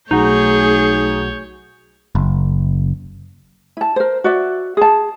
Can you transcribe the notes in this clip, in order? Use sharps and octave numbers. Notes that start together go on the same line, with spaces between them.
B1 A3 D#4 F#4 G#4 C#5 G6
F#1
E4 A5
A#4 C5
F#4 D5 E5
G#4 A5